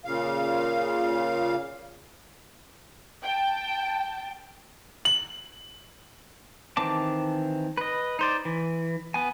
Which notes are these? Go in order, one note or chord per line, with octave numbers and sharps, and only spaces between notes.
A#2 C#3 F5
G5 A5
F#7
D#3 E3 C4 A5 D6
B4 D#5
D#4 C5 D5
E3
B3 G#5